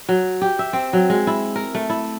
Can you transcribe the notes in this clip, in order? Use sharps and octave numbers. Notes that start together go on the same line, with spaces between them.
F#3
G4
E5
C4
F#3
G#3
E4
A#4
A3
E4